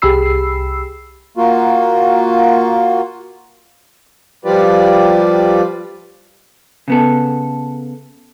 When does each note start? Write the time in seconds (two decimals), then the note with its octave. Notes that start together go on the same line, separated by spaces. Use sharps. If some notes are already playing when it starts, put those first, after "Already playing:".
0.02 C2 G4 G#4 B5 E6 C7
1.37 A#3 F4 F#4
4.45 F3 G3 F4 G4 B4 D5
6.88 C#3 B3 A4